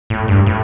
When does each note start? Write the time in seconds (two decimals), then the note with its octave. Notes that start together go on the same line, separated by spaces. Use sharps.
0.10 A2
0.28 G2
0.46 A2